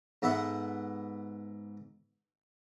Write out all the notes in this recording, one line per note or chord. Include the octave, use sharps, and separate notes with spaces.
G#2 B3 A4 E5 F#5 B5